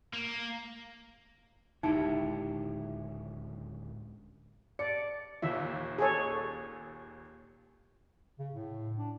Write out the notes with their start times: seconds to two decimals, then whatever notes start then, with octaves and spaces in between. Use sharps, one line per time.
0.13 A#3
1.83 D1 C#2 A#2 D#4 E4 G4
4.79 D5 C#7
5.42 D#2 A#2 E5
5.98 G#4 A4 C#5
8.39 C#3
8.53 A2
8.98 D4